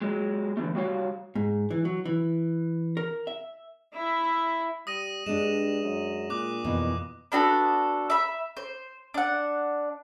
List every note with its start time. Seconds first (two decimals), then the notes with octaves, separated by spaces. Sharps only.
0.02 F#3 G#3
0.57 D3 E3 A3
0.75 G3 F#4 C#5 F5
1.35 G#2
1.71 E3
1.85 F#3
2.05 E3
2.97 A#4
3.27 E5
3.93 E4 E5
4.87 G3 D#6 A#6 D#7
5.26 G2 G#3 D4 E7
5.82 F#2
6.30 A#2 D6 F#6
6.64 F2 B2 E3
7.32 B3 D4 F#4 A4
8.10 E5 B5
8.57 C5
9.14 D4 F#5